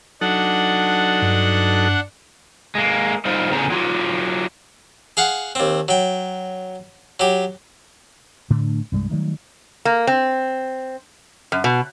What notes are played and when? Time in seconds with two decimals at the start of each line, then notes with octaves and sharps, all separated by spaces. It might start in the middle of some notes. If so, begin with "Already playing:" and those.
0.21 F#3 D4 D#4 A4 F#5
1.22 G2
2.75 G#3 A#3
3.25 G3 C4 D#4 F4
3.52 E2 A2 C#3 G4 G#4 A#5
3.70 F#3 F4 G4
5.17 G#4 F5 F#5
5.55 D#2 C4
5.88 F#3 G5
7.20 F#3 G4
8.50 A2 D3 A3 D4
8.92 C2 G2 G3 G#3
9.11 D#3 F#3 G3 A3
9.85 A#3
10.07 C4
11.52 F#2
11.64 B2